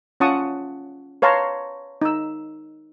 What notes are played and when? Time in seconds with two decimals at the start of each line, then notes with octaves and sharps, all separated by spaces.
0.20 C#4 F4 F#5 A5 C#6 D#6
1.22 B4 C#5 F5 A5 A#5 C6
2.02 D#4 E6